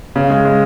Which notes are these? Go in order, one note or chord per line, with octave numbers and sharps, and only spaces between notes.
C#3
G#3
G#3